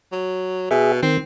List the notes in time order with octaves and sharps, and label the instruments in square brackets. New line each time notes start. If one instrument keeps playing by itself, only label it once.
[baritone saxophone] F#3
[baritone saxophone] B2 [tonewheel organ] G#4 E5
[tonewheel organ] D#3 [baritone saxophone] C4